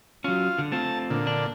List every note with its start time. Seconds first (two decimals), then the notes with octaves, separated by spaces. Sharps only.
0.24 F#3 C#4 F4
0.59 D3
0.72 A3 C4 F4 A5
1.10 A#2 D3
1.27 D4